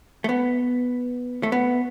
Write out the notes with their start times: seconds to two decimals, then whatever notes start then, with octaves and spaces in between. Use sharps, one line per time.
0.24 A3
0.29 B3
1.43 A3
1.52 B3